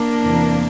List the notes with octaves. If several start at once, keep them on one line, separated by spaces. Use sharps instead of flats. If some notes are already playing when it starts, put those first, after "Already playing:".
Already playing: A#3 D4
E2 C3 E3